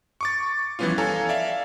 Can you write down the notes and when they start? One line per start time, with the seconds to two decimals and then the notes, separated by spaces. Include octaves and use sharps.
0.21 C#6 D6 A6
0.79 E3 F3 G3 B3 C#4 F4
0.98 A4 C#5 F5 G#5 A#5
1.29 D5 E5 F5